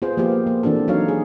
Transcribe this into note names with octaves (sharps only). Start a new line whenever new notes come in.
B3 F4 G#4 C5
F3 A#3 B3 F4 G4
A#3
E3 C4 D4 F#4 A4
F#3 D#4 F#4 C#5 F5
G#4